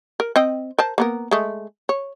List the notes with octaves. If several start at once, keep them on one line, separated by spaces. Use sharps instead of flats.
A#4
C4 D#5 G5
A#4 C5 A5
A#3 B3 A#4
G#3 A3
C#5